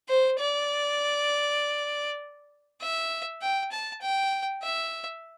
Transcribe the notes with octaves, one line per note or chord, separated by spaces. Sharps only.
C5
D5
E5
G5
A5
G5
E5